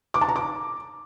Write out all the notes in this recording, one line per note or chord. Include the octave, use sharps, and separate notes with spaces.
D6
A5
A#5
D6